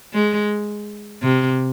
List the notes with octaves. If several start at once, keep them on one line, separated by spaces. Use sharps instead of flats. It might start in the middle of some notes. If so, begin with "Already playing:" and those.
G#3
C3